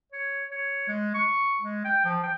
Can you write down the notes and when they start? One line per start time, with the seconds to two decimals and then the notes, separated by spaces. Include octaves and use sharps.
0.12 C#5
0.51 C#5
0.88 G#3
1.14 C#6
1.61 G#3
1.85 G5
2.05 F3
2.23 G5